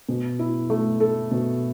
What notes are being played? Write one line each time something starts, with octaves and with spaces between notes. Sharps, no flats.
B2
E4
A3
A4
B2